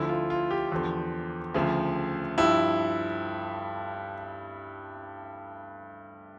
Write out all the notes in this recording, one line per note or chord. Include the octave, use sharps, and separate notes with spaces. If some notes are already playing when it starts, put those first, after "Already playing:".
Already playing: D2 D3 F3 E4
F4
F4
G4
E2 D3 F3
D2 C#3 F3
G2 F3 E4